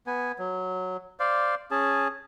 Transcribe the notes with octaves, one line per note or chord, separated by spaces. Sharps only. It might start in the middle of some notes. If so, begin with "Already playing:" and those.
B3 G#5
F#3
C5 D5 F5
C#4 G#4 A5